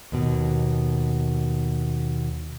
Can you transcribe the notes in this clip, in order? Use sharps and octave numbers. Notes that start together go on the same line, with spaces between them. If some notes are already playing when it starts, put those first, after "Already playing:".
D#2 B2